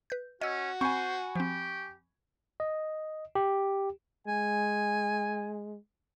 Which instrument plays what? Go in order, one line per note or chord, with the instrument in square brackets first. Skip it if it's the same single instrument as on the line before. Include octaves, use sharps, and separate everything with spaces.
[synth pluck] B4 G6
[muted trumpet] C#4 [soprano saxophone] F#4 [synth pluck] D#5 E6
[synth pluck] C4 [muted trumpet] C5 [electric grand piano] G#5 B5 C#6
[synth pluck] F3 C4 [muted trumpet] G4
[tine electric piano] D#5
G4
[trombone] G#3 [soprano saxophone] G#5